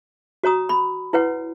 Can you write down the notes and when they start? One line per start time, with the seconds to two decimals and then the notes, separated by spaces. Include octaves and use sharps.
0.43 F#4 C#5 A#5 D#6
0.69 B5
1.13 E4 B4 C#5 F#5